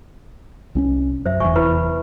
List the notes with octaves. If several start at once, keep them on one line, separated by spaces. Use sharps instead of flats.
C2 C4 C#4
F#2 C5 E5
F1 E2 E5 G#5 C#6
E4 B4 B5